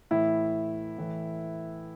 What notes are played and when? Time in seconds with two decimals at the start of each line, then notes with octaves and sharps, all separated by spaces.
0.11 A2 E3 E4
0.98 A2 E3